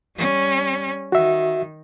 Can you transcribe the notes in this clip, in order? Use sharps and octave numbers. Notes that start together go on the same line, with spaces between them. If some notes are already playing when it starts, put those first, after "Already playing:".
G3 C#4
D#3 F#4 E5